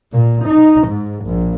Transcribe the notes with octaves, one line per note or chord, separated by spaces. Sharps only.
A#2
D#4
G#2
A#1